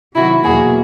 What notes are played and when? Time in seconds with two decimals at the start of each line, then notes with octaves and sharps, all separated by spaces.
0.15 C3 D#3 F#3 E4 F#4
0.44 E2 B2 F#3 A#3 F#4 G#4